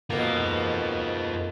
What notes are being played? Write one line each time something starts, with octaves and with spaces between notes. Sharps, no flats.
G#2 B2 A#3 F4 A4